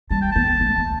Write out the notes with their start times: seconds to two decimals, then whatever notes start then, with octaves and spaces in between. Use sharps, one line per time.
0.11 G3 A5
0.22 G5
0.32 B3 A5
0.60 A3
0.77 B3